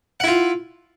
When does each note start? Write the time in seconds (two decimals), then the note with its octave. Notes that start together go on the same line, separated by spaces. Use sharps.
0.20 F#5
0.24 E4
0.27 F4